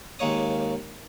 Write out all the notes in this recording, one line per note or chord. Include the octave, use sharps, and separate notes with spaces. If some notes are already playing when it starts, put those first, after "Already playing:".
D#2 G#3 A#3 C#5 D#6